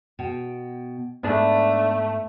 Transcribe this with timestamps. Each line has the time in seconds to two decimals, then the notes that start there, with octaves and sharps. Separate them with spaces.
0.19 B2 G5
1.23 G#2 A3 B3 D4